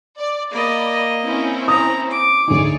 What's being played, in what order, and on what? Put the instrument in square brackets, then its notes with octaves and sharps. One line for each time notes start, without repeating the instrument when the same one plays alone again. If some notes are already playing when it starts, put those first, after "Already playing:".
[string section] D5
[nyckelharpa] A#3 D#5 [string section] D5 B5
[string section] C4 C#4 E4
[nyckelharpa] A#5 [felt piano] D#6
[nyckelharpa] D6
[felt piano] D2 D#4 [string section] G#4 C#5 D5